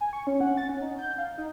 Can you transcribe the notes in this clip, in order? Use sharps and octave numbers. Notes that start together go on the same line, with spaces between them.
G#5
C#6
C#4
F#5
A6
C#4
D#4
G6
F5
D#4